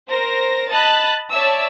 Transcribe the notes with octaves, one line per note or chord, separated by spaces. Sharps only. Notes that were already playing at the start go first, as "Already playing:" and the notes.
A#4 C5 A#6
D#5 A5 B5 F#6 A6
C#5 D5 E5 A5 E6